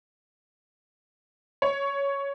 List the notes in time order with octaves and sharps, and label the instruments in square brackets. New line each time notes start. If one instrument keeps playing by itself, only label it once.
[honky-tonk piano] C#5